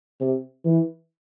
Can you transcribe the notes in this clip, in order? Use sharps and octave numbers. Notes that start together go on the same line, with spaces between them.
C3
E3